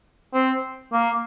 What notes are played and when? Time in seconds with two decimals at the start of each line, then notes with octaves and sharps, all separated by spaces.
0.34 C4
0.93 A#3